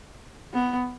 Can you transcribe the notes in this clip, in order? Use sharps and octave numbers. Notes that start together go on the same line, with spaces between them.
B3